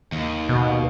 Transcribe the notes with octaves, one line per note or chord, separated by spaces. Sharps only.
D#2
B2